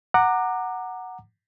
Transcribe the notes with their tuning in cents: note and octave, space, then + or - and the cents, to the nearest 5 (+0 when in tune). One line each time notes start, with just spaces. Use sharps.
F#5 +0 A#5 -10 D6 +25